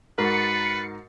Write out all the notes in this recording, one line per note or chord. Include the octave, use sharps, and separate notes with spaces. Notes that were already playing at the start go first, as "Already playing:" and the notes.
G#2 F#4 A#4 B4 A6 C7 C#7